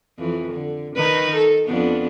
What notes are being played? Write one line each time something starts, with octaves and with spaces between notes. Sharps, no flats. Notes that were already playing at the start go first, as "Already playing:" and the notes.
F2 E3
D3
D#3 D#4 B4
A4
F2 B3 D4